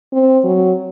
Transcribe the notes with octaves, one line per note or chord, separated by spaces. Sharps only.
C4
F#3